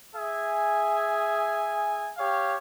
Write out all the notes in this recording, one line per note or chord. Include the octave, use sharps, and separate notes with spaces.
G#4 E5 G#5
G4 C#5 F5